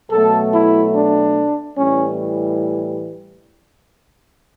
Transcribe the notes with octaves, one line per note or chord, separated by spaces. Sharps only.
B2 F#3 A3 A4
E4
D4
A2 E3 G3 C#4